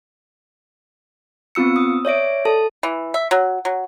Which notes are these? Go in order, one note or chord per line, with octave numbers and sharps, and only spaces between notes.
B3 C4 F4 E6 C#7
D#6
C#5 D5 E5 D7
A4 A5
E3
E5
F#3
F#3